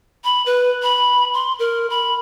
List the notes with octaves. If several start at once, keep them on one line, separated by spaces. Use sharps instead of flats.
B5
B4
B5
C6
A#4
B5